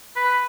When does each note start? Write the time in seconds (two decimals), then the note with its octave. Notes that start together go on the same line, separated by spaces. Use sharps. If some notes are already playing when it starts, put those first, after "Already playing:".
0.16 B4